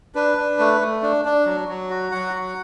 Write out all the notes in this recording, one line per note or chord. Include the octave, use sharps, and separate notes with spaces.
D4 B4
D4
A3
A3
D4
D4
F#3
F#3
F#4
F#3 F#5
F#4